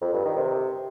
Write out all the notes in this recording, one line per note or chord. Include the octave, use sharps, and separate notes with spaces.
F2
G2
D#3
C3